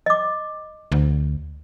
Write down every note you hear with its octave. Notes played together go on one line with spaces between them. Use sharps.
D#5 D6
D2